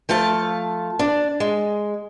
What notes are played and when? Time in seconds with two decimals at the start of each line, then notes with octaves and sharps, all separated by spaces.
0.09 F3 A3 F5 A5
0.99 D4
1.40 G#3